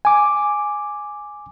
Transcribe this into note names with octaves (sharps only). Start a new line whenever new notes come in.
G#5 D6